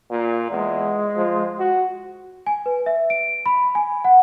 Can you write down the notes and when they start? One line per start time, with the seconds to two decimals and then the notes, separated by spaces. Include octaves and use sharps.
0.10 A#2
0.50 E2 G#3
1.16 F3
1.59 F#4
2.46 G#5
2.66 B4
2.86 E5
3.10 D7
3.46 B5
3.75 G#5
4.04 F#5